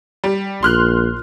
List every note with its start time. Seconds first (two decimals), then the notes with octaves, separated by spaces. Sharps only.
0.24 G3
0.63 A#1 C6 F6 F#6